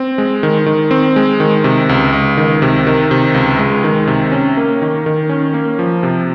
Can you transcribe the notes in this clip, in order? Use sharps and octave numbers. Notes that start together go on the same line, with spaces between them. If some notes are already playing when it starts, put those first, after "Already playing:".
Already playing: C4
G#3
D#3
D#3
C4
G#3
D#3
C3
C#2
C#2
D#3
C3
D#3
C3
C#2
G#3
D#3
C3
C#4
A#3
D#3
D#3
C#4
A#3
F3
C3